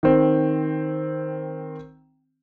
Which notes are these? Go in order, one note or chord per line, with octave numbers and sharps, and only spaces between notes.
D#3 C4